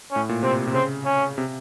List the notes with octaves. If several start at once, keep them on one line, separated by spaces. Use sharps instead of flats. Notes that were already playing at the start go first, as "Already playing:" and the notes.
A2 C#4
A#2
C3 C4
C3
C#3 C4
C#4
C3